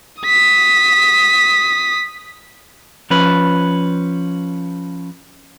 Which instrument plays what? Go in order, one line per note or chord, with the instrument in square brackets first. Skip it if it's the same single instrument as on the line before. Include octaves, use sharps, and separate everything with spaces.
[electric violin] D#6 B6
[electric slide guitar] F3 C#4 B4